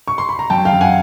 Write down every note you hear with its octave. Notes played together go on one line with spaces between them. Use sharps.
C#6
C6
B5
A#5
F#2 G5 A5
F5 G5
F#2
F#5 G#5